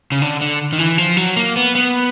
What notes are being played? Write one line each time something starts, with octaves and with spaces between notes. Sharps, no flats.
C#3
D3
D3
D#3
E3
F3
F#3
A#3
B3
B3